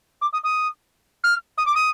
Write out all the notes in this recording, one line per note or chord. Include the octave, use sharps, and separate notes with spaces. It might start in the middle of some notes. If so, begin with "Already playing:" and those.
D6
D#6
D#6
F6
D#6
D6
D#6